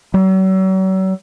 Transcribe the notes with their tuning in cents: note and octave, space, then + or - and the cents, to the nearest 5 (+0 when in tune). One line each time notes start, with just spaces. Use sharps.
F#3 +40